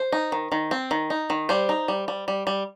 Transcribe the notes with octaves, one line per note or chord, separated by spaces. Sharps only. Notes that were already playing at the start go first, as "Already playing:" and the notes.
Already playing: C5
D#4
D#3
D#3
C4
D#3
D#4
D#3
G3 C5
D#4
G3
G3
G3
G3